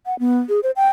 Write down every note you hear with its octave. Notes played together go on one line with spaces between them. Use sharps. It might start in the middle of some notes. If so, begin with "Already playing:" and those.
F#5
B3
G#4
C5
G5